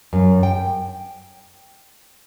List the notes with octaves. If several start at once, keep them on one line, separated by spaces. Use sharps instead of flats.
F#2
G5